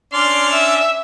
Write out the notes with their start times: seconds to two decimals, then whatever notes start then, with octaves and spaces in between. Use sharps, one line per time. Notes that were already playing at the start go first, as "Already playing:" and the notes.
0.13 C#4 D4 D5 C6 F6
0.52 E5